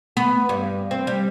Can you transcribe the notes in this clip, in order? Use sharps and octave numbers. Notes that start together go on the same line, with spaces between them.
B3
G2
C4
G3